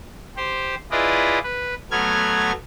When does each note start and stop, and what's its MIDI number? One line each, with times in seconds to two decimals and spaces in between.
0.37 0.75 67
0.37 0.75 72
0.91 1.39 64
0.91 1.39 65
0.91 1.39 68
0.91 1.39 71
0.91 1.39 74
0.91 1.39 75
1.43 1.74 71
1.91 2.52 54
1.91 2.52 57
1.91 2.52 59
1.91 2.52 89
1.91 2.52 92